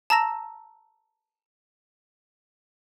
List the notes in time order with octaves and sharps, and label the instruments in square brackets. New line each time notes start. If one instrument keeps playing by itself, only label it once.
[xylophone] A5 A#5 E6 A#6 E7